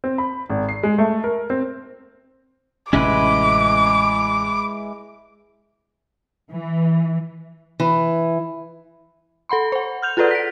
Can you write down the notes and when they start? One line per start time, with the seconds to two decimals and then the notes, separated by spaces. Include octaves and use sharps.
0.04 C4
0.18 B5
0.49 G#1
0.69 C7
0.83 G#3
0.98 A3
1.24 A#4
1.50 C4
2.93 A1 C3 G#3 C#4 E4 B4 D6
6.51 E3
7.80 E3
9.49 A4 F#5 B5 C6
9.72 C5 F#5
10.03 F6 G6 F7
10.17 F4 G#4 A4 B4 D5 F#5
10.31 B6 D7